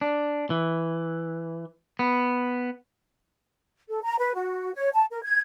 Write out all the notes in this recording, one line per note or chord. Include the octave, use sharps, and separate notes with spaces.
D4
E3
B3
A4
A#5
B4
F#4
C#5
A5
A#4
G#6